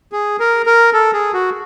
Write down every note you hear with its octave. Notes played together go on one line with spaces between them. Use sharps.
G#4
A#4
A#4
A4
G#4
F#4